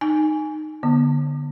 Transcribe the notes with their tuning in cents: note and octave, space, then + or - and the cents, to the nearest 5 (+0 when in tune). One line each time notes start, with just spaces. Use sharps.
D#4 -15 G#5 +0
D3 +0 B3 -25